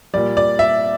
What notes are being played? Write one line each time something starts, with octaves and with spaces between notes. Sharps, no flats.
A#2 G3 D5
D5
E5